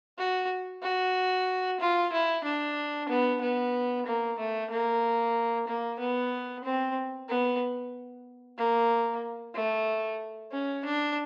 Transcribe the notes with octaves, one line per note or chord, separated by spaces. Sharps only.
F#4
F#4
F4
E4
D4
B3
B3
A#3
A3
A#3
A#3
B3
C4
B3
A#3
A3
C#4
D4